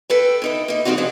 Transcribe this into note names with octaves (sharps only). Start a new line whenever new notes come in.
A4 B4 G5
D3 D#4 E4
A#3 D#4
F3 G3 C4 D4 D#4 F#4
F3 G#3 C4 D4 D#4